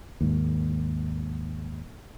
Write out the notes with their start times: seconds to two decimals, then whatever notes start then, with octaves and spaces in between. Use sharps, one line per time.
0.21 D#2 G#2